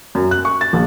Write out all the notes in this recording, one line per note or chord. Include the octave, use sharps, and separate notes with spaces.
F#2
F#6
C#6
A6
A#1